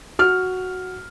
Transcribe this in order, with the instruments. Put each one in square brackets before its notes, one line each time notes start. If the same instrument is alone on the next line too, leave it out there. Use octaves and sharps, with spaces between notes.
[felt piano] F#4 F6